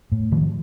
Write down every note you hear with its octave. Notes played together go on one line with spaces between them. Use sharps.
A2
A2 D#3 F3